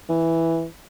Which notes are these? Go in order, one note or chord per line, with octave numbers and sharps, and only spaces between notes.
E3